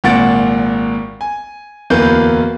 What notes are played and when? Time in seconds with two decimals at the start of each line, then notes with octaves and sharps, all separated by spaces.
0.04 G#1 A#2 F#5 A6 D7
1.21 G#5
1.90 D1 E2 A#3 B4 G6